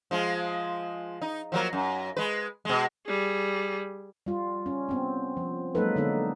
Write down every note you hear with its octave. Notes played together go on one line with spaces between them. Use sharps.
F3 G#3 F4
D#4
F3 F#3 A#3
F#2
G#3 B4
B2 G#3
G3 G#4
G3 F4
C#4
B3 C4
F3
F#3 G#3 A#3 D#4 A4 B4
D3 B3 D4 D#4 A4